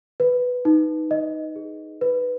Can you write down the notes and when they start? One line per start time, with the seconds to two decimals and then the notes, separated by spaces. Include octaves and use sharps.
0.20 B4
0.65 D#4
1.11 D#5
1.56 G#4
2.01 B4